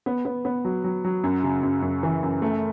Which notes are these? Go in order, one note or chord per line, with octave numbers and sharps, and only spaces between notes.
B3
B3
B3
F#3
F#3
F#3
F#2
C#3
F#2
F#2
E3
F#2
A3